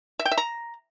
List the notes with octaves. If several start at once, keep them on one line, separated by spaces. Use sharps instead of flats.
E5
G5
E5
A#5